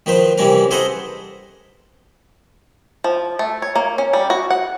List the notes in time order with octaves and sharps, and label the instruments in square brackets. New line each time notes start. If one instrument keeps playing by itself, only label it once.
[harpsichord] D#3 F3 B4 C5
C3 E3 G3 C#4 A#4
G#4 A4 B4 C5 D#5 F#5
[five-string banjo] F3
A3
C#5
A#3
C#4
G3
F#4
F#5